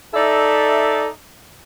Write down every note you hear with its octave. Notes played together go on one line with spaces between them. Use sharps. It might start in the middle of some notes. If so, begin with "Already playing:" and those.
D#4 A4 D5 E5